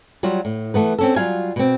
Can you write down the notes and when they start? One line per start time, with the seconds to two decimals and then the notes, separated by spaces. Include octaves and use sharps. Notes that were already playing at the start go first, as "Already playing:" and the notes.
0.23 F#3 G3 F4 F#4
0.45 A2
0.74 E3 A3 B3 B4
0.98 C4 C#4 A4
1.16 F#3 G3 F4 F5 G#5
1.56 B2 C4